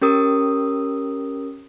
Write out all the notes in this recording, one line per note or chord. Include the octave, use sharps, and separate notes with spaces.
C#4 G4 A#4 D#6